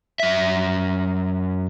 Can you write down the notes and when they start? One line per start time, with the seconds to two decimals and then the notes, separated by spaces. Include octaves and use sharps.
0.20 F#2 E5